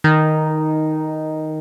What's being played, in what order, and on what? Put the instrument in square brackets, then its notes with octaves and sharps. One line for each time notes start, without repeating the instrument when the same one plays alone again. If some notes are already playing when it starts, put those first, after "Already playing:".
[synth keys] D#3 D#4